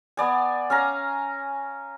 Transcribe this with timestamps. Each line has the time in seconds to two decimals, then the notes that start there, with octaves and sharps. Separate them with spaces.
0.17 B3 D5 G#5
0.70 C#4 F5 G#5 A#5